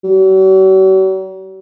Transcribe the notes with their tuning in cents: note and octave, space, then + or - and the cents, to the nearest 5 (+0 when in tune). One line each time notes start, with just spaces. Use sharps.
F#3 +45